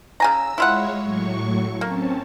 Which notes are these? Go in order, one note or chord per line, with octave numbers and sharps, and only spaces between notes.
C#3 G#5 A#5 E6
G#3 E4 F4 C#5 F#5
A2 F#3 C#6
A#3 C4 C#4 A5